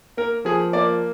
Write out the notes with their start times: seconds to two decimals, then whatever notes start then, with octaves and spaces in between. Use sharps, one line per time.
0.17 A#3 A#4
0.45 F3 G#4
0.73 A#3 D5